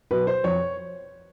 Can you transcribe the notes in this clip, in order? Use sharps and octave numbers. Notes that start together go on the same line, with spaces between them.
B2 F#3 B3 B4
C5
F2 C#5